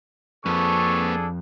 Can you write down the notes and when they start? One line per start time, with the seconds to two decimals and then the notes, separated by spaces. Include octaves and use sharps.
0.46 F2 A#3 D4 G#4 A4 B4 C#6